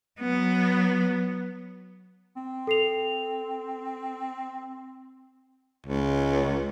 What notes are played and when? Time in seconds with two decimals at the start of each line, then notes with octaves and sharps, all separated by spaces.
0.20 F#3 B3
2.36 C4
2.67 A4 C7 F7
5.86 C#2